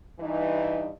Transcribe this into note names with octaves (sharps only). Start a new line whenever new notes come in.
G2 E3 D#4